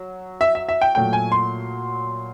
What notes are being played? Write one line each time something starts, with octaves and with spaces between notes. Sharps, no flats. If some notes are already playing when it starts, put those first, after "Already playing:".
Already playing: F#3
E5
E5
E5
G5
A#2 F#3 A3 G5
G#5
C6